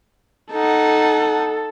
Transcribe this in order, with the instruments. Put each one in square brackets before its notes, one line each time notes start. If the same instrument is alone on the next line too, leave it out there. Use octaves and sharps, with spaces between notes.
[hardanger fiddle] D#4 F#5 [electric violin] A4